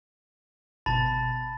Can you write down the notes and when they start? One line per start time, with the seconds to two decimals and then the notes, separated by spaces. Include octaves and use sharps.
0.86 G1 B2 A5 B5 A6